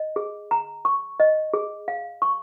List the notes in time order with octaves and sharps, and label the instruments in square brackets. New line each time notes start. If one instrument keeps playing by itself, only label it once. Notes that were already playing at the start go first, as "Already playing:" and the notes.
Already playing: [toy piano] D#5
G#4
A#5
C#6
D#5
G#4
F5
C#6